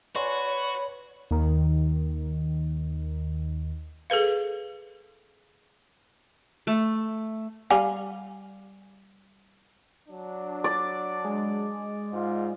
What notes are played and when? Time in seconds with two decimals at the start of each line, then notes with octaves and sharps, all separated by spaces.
0.16 F#4 B4 C#5 D5 G#5 C6
1.31 D#2 D#3
4.10 G#4 A4 B4 F5
6.67 A3
7.70 G3 F5 G#5
10.08 F#3 D4
10.64 D5
11.24 G#3
12.13 G#2 F4